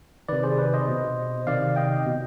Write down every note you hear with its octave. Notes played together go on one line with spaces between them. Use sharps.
C3 D#3 B4 D5
G#4 C5
B4 D5
C5 D#5
B2
C3 D#3 D5 F5
D#5 G5
B2